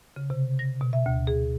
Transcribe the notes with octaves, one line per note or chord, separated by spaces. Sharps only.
C#3
C3
A#6
B2
E5
D2
G#4